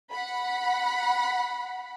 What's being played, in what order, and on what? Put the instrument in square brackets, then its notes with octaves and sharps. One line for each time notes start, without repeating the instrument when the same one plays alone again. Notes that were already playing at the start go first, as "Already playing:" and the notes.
[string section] F#5 B5